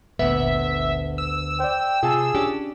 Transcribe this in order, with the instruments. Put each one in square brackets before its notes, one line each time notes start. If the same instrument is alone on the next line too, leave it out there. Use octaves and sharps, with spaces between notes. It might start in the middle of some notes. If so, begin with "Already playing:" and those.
[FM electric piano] G1 A#2 [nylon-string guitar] D2 B3 [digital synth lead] E5
[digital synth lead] E6
[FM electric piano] C5 D5 [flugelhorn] G5
[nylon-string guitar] C3 [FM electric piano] F4 A5 [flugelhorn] G#4
[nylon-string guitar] C#4 D4 G4